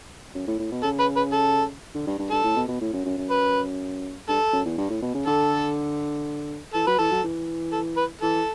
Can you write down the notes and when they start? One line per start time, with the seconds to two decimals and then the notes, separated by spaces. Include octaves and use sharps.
0.35 F#2
0.47 A2
0.59 A2
0.72 B2
0.83 C#3 A4
1.00 B4
1.17 B4
1.33 A4
1.94 D3
2.07 G2
2.19 G2
2.31 G2 A4
2.44 A2
2.56 B2
2.68 B2
2.81 A2
2.93 F#2
3.06 F#2
3.18 F#2
3.30 B4
4.28 G2 A4
4.53 F#2
4.65 E2
4.78 G2
4.90 A2
5.02 B2
5.15 C#3
5.26 D3 A4
6.74 E3 A4
6.87 F#3 B4
6.99 E3 A4
7.11 F#3
7.24 E3
7.72 A4
7.97 B4
8.21 E3 A4